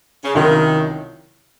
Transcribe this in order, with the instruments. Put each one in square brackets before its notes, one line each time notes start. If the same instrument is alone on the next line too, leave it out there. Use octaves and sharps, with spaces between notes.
[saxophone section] C#3
[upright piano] C2 C3 F#3 C#4 F4 [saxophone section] D#3